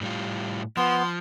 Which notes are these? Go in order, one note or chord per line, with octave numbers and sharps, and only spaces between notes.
A2 G3 F4
F3 B3 C6